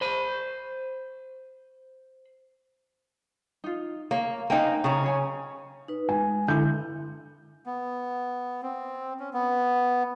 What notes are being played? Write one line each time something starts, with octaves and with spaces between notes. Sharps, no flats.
C5 B5
D#4 F4
A#3 C#5
A#3 D#4 C5 G5 G#5
C#3 C#4 A#5
G#4 C#5 G#5
D#4 B4
G#3 G#5
D3 E4 G6
B3
C4
C#4
B3